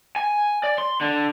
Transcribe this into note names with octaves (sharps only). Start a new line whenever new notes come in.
G#5
D5
C6
D3